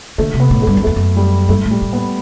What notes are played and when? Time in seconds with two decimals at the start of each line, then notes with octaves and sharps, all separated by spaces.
0.18 D3 A3
0.34 C3
0.40 B3
0.51 A2
0.62 A3
0.67 G2
0.77 F#2
0.83 E2 A3
0.96 F#2
1.16 G3
1.49 G2 A3
1.65 A2
1.71 G3
1.82 A2
1.93 B3